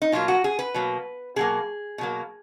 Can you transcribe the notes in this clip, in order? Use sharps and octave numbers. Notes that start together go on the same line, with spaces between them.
D#4
B2 F#3 A#3 F4
F#4
G#4
B4
B2 F#3 A#3
B2 F#3 A#3 G#4
B2 F#3 A#3